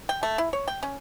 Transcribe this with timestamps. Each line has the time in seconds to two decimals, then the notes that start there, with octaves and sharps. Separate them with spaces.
0.09 G5
0.23 A3
0.38 E4
0.53 C#5
0.68 G5
0.83 C#4